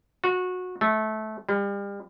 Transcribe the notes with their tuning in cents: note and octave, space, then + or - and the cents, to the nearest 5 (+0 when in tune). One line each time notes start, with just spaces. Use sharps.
F#4 -20
A3 -20
G3 +35